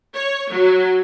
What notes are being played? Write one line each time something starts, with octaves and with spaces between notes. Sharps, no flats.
C#5
F#3